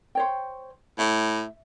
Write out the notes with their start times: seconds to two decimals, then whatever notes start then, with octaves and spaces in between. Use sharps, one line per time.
0.15 C5 C#5 G5
0.99 A2 E5